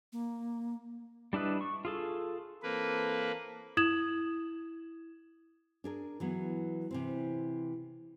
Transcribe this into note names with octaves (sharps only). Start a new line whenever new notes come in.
A#3
G3 D4 E4 B4 D#5
C#6
F4 G#4 A4
E3 A#3 C4 A4 B4
E4 D#6 G#6 E7 F#7
D4 G#4 A#4
E3 F#3 B3
C3 E3 C4